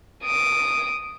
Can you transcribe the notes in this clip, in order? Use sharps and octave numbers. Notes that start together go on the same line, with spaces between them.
D#6 D7